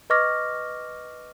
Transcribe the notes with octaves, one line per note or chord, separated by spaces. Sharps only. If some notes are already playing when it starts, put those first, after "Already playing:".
B4 D#5 C#6 D6 F6 A#6